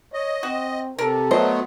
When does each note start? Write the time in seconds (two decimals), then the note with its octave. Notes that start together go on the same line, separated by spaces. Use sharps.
0.13 C#5 D#5
0.43 C4 F#4
0.99 C3 A4 A#4
1.31 F#3 A3 B3 C5 D#5